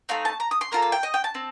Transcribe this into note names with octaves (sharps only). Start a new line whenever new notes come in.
A3 C4 D#4 F5
A5
A#5
D#6
C6
A#3 F4 A4 A#5
A5
G5
D#5
G5
A5
C4